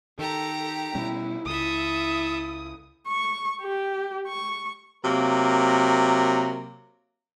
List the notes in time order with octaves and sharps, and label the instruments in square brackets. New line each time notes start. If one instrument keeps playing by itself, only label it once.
[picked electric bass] D#3 [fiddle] G4 A#5 [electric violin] A4
[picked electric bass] B2 G3 C#4 [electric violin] E4
[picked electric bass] C#2 [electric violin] E4 D#6 [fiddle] A4 E5
[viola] C#6
G4
C#6
[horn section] C3 F#3 A#3 A#4